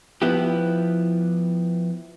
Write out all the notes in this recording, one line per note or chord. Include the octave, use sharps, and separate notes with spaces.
F3 B3 E4 G4